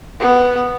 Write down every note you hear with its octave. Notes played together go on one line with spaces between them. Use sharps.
B3